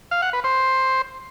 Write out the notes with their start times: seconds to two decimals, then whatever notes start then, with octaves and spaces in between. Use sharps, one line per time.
0.11 F5
0.22 F#5
0.33 B4
0.44 C5